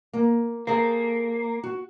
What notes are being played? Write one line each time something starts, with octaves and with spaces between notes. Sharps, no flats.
A#3
A#3 G#4 A4 C5
F#4